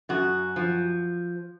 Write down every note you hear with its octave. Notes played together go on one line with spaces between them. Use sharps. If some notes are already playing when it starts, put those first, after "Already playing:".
F#2 F#4
F3